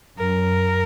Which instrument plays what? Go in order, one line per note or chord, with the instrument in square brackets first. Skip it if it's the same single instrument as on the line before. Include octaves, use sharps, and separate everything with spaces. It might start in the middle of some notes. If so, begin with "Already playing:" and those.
[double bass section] F#2 [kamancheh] A#4